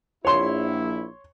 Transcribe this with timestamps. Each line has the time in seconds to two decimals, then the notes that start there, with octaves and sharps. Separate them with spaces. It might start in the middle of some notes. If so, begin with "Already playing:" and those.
0.25 A#1 E4 C#5 C6